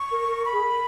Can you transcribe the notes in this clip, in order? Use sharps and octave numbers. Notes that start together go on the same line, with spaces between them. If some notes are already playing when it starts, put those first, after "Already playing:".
Already playing: C#6
A#4
A#4
B5
G#4
A#4